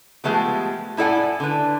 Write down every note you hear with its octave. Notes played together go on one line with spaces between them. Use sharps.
F3 G#3 A3 B3 G4
A2 E4 A4 D5 F#5 G#5
D3 B4